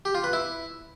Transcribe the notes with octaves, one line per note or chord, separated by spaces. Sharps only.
G4
F4
B4
E4